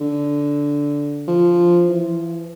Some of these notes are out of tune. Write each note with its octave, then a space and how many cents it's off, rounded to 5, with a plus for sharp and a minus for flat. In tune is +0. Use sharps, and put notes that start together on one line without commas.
D3 -10
F3 -5
E3 +25